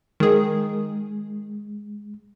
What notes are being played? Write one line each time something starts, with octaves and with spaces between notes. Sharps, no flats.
D#3 G#3 G#4